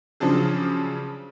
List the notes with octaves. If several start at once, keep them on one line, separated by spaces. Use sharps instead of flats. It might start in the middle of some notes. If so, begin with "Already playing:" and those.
C#3 F3 F#3 D4 G#4